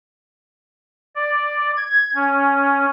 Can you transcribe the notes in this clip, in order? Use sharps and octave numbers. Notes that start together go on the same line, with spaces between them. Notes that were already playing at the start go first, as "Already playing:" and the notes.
D5
G#6
C#4